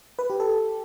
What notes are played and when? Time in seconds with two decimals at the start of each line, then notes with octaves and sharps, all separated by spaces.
0.19 B4
0.30 G4
0.40 A4